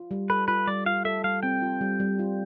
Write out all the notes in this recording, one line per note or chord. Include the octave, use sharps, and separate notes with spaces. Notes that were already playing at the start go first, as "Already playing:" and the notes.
Already playing: F4
G3
A4 B4
F4 B4
G3 D5
F4 F5
A4 E5
G3 F5
C4 G5
F4
G3
G3
F4